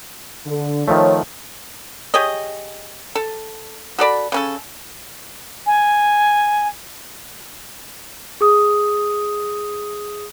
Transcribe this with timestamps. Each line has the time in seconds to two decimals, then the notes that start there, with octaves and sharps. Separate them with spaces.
0.46 D3
0.88 D#3 F3 A3 C#5
2.14 G4 G#4 C#5 D#5
3.15 A4
3.99 F#4 A4 D5 B5
4.32 C#3 C#4 A4
5.66 G#5
8.41 G#4 D#6